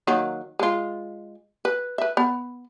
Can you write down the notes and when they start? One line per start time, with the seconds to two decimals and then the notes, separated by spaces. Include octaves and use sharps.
0.07 D#3 F#3 A#3
0.59 G#3 F4
1.65 B4
1.98 B4 E5
2.17 B3